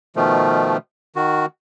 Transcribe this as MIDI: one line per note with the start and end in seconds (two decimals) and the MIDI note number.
0.16 0.77 47
0.16 0.77 51
0.16 0.77 53
0.16 0.77 57
1.16 1.46 51
1.16 1.46 66